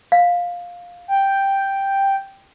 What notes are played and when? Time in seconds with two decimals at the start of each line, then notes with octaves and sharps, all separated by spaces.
0.12 F5
1.08 G5